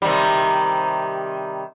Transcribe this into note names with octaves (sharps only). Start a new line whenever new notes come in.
C3 D#3 G3